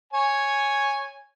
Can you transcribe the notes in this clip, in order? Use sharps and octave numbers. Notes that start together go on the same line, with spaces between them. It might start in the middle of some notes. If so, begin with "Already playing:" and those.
C#5 G#5